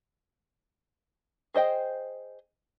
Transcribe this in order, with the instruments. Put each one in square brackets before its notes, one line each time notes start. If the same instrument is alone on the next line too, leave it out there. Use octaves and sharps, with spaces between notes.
[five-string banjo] G#4 C5 D#5 G5